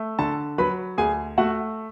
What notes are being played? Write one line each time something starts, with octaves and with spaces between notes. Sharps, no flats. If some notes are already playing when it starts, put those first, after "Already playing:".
Already playing: A3
D3 A4 A5
F#3 B4 B5
D2 G#4 G#5
A3 F#4 F#5